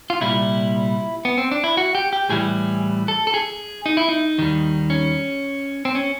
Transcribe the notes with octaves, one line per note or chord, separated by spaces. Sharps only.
F4
C2 A#2 G3 E4
B3
C4
D4
E4
F#4
G4
G4
A2 E3 G3 G#4
A4
A4
G#4
D#4
E4
D#4
D#2 D#3 G3
C#4
C4
C#4